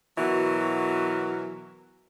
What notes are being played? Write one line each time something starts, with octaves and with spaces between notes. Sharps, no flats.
B2 E3 F#3 F#4 A#4